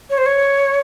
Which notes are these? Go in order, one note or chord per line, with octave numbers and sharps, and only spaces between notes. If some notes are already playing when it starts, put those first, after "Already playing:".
C#5
C5
C#5